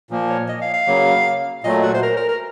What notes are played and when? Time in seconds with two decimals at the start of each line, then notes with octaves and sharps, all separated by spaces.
0.10 A#2 F3 A#3
0.30 C#5
0.48 D#5
0.61 F5
0.74 F5
0.87 C#3 F#3 A#3
1.64 A#2 F#3 A3 D#5
1.83 F#4
1.94 C5
2.03 A#4
2.16 A#4
2.29 A#4